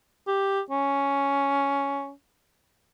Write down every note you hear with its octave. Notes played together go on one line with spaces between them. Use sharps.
G4
C#4